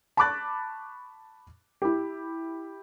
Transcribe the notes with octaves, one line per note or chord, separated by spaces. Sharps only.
A5 B5 C#6 D6 F#6 A6
E4 G4